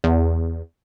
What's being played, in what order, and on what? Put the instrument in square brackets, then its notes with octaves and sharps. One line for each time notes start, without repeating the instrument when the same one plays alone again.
[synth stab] E2